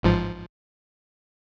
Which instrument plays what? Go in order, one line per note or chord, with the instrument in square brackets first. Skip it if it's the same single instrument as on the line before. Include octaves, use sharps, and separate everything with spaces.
[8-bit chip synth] A1 G#2 F3